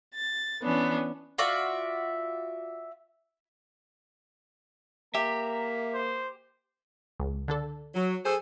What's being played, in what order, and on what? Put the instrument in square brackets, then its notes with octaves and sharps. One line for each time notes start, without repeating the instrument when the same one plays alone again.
[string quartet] A6
E3 B3 C#4 D4
[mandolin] F4 F#4 D5 E5
[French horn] A#3 [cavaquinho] G4 [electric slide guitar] E5 [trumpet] A#5
[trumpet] C5
[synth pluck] C#2
D3 D4 A4
[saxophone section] F#3
G#4 A4 C5